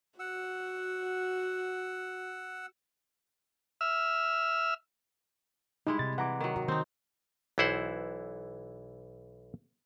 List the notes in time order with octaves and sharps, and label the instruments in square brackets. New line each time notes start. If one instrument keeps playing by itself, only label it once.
[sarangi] F#4 [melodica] F#5 E6
[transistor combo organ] E5 E6 F6
[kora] G3 G#3 E4 [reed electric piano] D#4
[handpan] C3 [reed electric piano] A6
[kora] E3 [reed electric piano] F#5 A#5 D6
[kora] D#3 F#3
[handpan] F#4 D#5
[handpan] D#3 [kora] C4 D#4
[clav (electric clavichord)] B1 E3 E4 C5 F#5